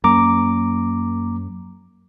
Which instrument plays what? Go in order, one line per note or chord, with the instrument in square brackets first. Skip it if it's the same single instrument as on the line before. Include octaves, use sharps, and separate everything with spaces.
[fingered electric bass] F#2 [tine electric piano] A#3 A#5 D6